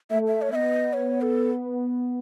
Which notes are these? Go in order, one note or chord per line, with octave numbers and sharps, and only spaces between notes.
A3 E5
E5
C#5
B3 D#5 E5
C#5
A4